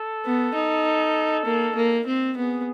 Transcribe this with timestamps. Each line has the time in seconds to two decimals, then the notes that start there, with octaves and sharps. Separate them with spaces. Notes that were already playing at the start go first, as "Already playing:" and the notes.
Already playing: A4
0.25 B3
0.55 D#4
1.46 A#3
1.76 A#3
2.07 C4
2.36 B3 G#4